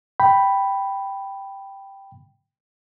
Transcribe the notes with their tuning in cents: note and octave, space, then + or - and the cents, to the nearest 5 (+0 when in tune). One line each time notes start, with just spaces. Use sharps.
G5 +0 B5 +0